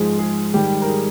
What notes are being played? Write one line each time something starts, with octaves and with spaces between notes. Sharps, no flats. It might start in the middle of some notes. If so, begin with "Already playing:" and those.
Already playing: G#2 F3 G#3 G#4
G#4
G#2 D#3 G3 G4
A#4
G#4